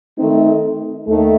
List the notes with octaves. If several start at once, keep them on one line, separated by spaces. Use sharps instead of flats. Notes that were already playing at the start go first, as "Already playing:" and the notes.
D#3 A3 C4 D#4
D#2 D#3 A3